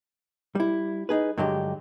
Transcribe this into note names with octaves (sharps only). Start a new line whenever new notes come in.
G3 E4
D#4 G#4 B4
G2 D3 F#3 G#3 G4